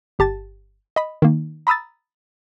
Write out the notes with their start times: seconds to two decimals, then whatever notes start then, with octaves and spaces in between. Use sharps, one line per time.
0.19 G1 G4 A5 A6
0.96 D#5 B5
1.22 D#3 A#3
1.67 A#5 B5 D#6 E6 A6